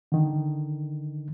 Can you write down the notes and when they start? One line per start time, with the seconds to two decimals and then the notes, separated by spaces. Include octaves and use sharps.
0.12 D3 D#3